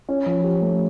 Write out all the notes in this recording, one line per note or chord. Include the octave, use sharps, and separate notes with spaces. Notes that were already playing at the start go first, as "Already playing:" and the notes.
C#4
F3
G4
A3